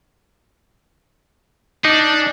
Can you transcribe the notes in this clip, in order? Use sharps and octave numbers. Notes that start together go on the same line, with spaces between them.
D4 D#4